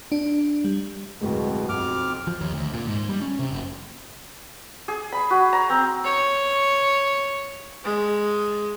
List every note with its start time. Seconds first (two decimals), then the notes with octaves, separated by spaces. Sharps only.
0.12 D4
0.64 G3
1.21 D1 F2 B2 G#3
1.69 B1 F2 D6 F6
2.27 F3
2.41 D#2
2.53 D2
2.74 A#2
2.88 G#2
3.09 G3
3.22 C#4
3.39 C3
3.51 F#1
4.88 G#4
5.12 B5
5.30 F#4
5.53 A#5
5.70 C4
6.04 C#5
7.84 G#3